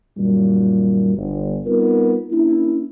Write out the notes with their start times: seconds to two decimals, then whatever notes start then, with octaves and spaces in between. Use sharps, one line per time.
0.17 F#2 A#2 D#3 F#3 G3
1.16 G1
1.66 G3 B3 C4 D#4 F4 A#4
2.31 A#3 C#4 D4 E4